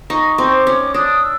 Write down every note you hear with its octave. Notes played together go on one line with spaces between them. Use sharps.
D#4 C#6
C4
D6
C#4
D4 D#6
E6